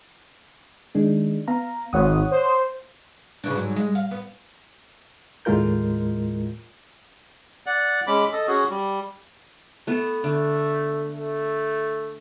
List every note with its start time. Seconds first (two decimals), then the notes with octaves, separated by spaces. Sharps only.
0.95 D#3 G#3 D4
1.48 B3 F5 A#5
1.93 G#1 C#5 F#5 D#6
2.31 C5
3.44 C#3 E3 D4
3.55 G#2 F#3
3.76 G#3
3.95 F5
4.11 B3
5.45 D#2 A2 G#3 F4 A#4 G6
7.66 D5 F#5
8.07 G#3 C#4 B5 D6
8.33 A4 D#5
8.47 C#4 F#4 G#4
8.70 G3
9.87 A3 B3
10.24 D3 A3
11.12 A3